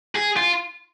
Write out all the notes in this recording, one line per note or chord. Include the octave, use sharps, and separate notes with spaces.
G#4
F4